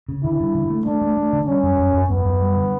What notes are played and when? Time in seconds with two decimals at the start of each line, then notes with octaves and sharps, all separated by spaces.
0.09 C#3
0.24 D3 E4
0.40 G2
0.55 D3
0.70 A3
0.86 A3 D4
1.01 A3
1.17 A3
1.33 D3
1.47 G3 C#4
1.63 F#2
1.79 F#2
1.94 F#2
2.10 F#2 B3
2.25 F#2
2.41 G3
2.56 D3